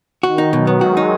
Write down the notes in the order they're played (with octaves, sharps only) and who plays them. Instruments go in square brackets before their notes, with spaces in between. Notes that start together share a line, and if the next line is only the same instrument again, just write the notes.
[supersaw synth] D#3 [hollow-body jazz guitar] F#4
[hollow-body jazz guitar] D#4
[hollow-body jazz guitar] B2 [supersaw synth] F#3
[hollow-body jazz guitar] B3
[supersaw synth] G#3 [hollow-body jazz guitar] F#4
[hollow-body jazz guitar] D#4